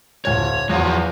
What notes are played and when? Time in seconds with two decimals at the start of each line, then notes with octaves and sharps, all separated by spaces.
0.25 D1 C#5 G#6
0.69 E2 F3 F#3